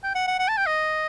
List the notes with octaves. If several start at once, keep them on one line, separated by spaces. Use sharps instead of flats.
G5
F#5
F#5
F#5
A5
G5
D#5